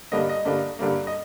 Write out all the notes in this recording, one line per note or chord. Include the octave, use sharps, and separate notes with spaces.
G2 D3 G3 A#3 D#5
D#5
G2 D3 G3 A#3
G2 D3 G3 A#3
D#5